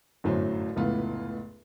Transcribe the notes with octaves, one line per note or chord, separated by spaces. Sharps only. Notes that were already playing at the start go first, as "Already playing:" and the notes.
G1 F#2 A2 F#3 C5
F1 C#2 A2 B3 F4